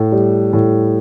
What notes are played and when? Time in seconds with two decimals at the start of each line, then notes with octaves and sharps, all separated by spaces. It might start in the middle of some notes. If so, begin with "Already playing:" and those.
Already playing: A2
0.12 G3
0.53 A2